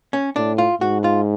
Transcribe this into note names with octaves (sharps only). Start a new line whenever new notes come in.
C#4
A2 D4
F4
G#2 F#4
F4